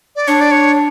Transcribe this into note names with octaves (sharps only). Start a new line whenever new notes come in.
D5
D4 C#5
D5
C#5